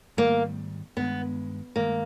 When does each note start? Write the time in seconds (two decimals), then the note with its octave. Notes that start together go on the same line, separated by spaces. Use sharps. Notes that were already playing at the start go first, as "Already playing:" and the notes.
0.17 G#2 D#3 G3 A#3
0.97 G2 D#3 G#3 B3
1.76 G2 D#3 G#3 A#3